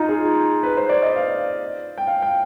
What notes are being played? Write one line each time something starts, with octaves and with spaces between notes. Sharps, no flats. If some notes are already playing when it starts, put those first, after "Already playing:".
Already playing: D#4 F4
G#4
B4
C5
D5
D#5
F5
G5
F5
G5